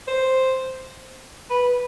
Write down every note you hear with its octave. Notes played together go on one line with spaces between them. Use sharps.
C5
B4